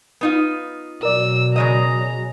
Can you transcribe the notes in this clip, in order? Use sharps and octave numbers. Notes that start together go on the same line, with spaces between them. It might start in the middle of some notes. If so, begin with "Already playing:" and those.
B3 D#4 F4
B2 F#3 A#4 D5 E6
C#3 G#3 D#5 A#5